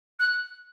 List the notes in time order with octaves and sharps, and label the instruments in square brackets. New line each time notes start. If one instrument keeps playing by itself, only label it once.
[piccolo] F#6